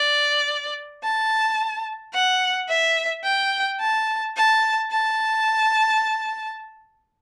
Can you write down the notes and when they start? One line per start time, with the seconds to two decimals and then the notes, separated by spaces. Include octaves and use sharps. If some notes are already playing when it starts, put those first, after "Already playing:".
Already playing: D5
1.03 A5
2.14 F#5
2.69 E5
3.24 G5
3.80 A5
4.36 A5
4.91 A5